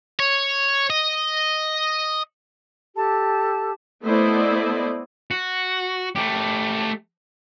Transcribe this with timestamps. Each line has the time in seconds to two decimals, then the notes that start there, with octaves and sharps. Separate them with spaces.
0.20 C#5
0.90 D#5
2.96 G4 A4 A5
4.03 A3 B3 E4 C5 D5 D#5
5.31 F#4
6.16 A3 G4